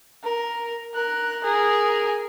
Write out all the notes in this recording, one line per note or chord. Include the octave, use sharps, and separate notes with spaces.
A#4
A#4 F#6
G#4 A#4